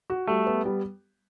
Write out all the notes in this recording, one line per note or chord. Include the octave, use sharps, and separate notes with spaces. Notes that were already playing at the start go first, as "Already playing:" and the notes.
F#4
G3 A3
B3
G3